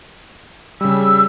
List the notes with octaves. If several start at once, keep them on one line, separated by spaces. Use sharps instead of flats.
C#3 G3 E6